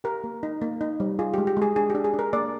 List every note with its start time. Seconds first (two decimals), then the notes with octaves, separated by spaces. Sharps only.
0.04 G4 A#4
0.24 A#3
0.43 D#4
0.62 A#3
0.81 D#4
1.00 G3
1.19 F4 G#4
1.34 G4
1.38 G#3
1.47 G4
1.57 G#3
1.62 G#4
1.76 D4 G#4
1.90 G4
1.95 D4
2.04 G#4
2.14 D4
2.19 A#4
2.33 A#3 D5